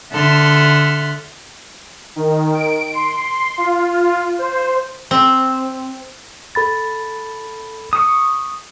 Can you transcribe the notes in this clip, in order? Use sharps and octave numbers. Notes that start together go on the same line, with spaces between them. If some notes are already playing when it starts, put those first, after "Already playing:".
D3 A4 E5 F#5 C6 F6
D#3
D7
C6
F4
C5
C4
A4 B5 A6
C#6 D#6